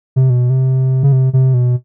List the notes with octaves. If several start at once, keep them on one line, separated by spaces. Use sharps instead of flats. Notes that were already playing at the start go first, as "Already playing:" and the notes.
C3
B2
C3
C#3
C3
C3
B2